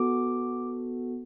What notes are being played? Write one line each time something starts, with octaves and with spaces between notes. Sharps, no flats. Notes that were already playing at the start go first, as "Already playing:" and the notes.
Already playing: B3 F#4 A4 D6